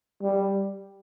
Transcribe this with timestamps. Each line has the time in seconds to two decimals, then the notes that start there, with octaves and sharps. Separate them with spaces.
0.23 G3